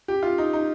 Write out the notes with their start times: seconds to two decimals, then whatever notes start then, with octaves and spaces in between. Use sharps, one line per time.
0.08 G4
0.22 F4
0.38 D#4
0.53 D#4